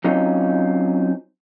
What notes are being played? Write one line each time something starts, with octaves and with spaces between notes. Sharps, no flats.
F#3 C4 C#4 D#4 F4